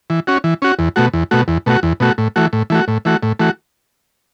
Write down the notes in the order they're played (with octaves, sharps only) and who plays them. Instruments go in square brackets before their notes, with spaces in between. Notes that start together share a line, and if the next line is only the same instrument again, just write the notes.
[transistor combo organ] E3
C#4 F#4
E3
C#4 F#4
E2
B2 A3 F#4
E2
B2 A3 F#4
E2
B2 A3 F#4
E2
B2 A3 F#4
A2
E3 A3 F#4
A2
E3 A3 F#4
A2
E3 A3 F#4
A2
E3 A3 F#4